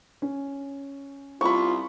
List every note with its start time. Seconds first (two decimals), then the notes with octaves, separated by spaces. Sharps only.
0.22 C#4
1.41 C2 F4 B5 C#6